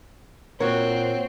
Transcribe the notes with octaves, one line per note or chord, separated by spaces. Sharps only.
A#2 C4 F#4 A#4 C#5